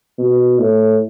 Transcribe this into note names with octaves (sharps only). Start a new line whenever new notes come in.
B2
A2